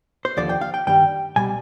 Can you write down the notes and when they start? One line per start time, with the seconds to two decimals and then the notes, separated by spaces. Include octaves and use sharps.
0.25 C5
0.37 D#2 D3 F3 D5
0.49 G5
0.61 F5
0.74 G5
0.87 G2 D#3 G3 G5
1.36 C2 B2 G3 G#5